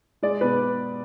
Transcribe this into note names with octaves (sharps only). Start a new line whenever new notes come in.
G#3 D5
B2 B4